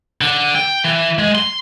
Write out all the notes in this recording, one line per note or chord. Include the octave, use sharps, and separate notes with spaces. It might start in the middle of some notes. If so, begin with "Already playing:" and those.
D3
G5
E3
G#3
C6